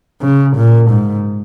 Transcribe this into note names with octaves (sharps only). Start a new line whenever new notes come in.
C#3
A#2
G#2